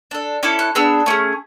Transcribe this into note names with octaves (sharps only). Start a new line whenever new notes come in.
D4 A4
C#4 E4 A4 D6
F#6
B3 D4 G#4 E6
A3 C#4 G#4